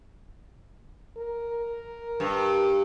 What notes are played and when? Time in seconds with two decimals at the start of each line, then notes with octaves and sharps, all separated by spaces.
1.17 A#4
2.20 G2